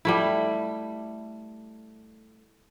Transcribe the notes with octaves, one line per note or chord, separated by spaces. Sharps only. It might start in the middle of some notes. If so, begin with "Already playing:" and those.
G3 A3 E4